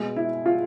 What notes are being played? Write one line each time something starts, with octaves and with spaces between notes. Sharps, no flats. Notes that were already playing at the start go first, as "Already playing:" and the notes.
Already playing: B2 G#3
E4
F4